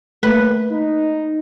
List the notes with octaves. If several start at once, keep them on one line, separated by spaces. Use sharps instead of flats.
A3 A#3 B4
D#4